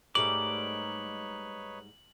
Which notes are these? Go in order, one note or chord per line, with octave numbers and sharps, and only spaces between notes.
G#2 G3 A3 D#4 B4 C#5 D6 F#7